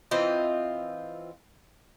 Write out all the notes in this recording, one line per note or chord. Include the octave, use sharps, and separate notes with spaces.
E3 C4 F4 D#5